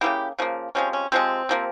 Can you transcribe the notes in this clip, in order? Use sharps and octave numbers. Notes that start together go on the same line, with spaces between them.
C#3 F3 A#3 E4 G4
C#3 F3 A#3
C3 F3 G#3 C#4
C#4
C3 F3 G#3 C4
C3 F3 A#3